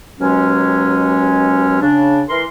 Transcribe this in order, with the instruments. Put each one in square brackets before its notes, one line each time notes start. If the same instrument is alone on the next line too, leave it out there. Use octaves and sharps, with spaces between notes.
[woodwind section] D#2 B2 F#3 G#3 C#4
C#3 D4
E3 A#4 C6